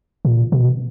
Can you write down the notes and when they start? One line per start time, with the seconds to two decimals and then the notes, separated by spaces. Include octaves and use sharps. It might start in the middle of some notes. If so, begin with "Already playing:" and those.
0.25 A#2
0.52 B2